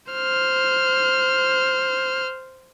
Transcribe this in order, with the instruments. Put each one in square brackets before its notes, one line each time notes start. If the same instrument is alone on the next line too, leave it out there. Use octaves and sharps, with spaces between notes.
[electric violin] C5 F6